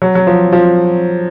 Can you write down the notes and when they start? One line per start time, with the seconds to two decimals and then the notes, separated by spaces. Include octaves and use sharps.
0.02 F#3
0.15 F#3
0.27 F3
0.52 F3